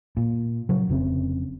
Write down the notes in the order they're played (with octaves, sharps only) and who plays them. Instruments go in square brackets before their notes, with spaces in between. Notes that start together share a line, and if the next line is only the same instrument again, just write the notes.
[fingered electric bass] A#2
C#3 F#3
F1 C#3 C4